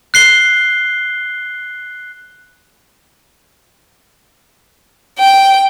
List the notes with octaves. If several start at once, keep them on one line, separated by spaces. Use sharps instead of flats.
F#6 C7 G7
G5